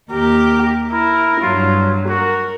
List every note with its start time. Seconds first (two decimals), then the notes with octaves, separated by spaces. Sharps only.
0.10 D#2 G4 A#4
0.92 E4 A#4
1.41 G2 F#3 F4
2.09 F#4 A#4